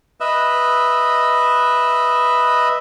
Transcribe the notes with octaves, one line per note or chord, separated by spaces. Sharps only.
B4 D#5 E5